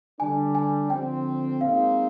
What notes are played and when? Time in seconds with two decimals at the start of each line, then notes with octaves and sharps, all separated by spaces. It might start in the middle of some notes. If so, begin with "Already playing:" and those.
0.19 D3 G3 D4 G#5
0.55 G#5
0.90 D3 F3 C4 G5
1.61 A#2 G#3 C4 D#4 F5